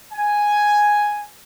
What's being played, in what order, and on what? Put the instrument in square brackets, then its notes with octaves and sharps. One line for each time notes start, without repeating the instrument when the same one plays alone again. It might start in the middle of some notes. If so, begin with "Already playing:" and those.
[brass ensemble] G#5